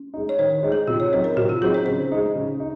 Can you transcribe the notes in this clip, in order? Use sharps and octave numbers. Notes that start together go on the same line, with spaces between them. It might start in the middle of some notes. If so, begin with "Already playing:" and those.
Already playing: C#4
G#3 D#4
C#5
D#3 C5
G#3 D#4
G#4
C3 F4
C#5
F#3 C4 D#4 C5
A#4
C3 F#4
F4
F#3 C4 D#4 G#4
C5
C#3 C5
G#3 D#4
C#3
D#4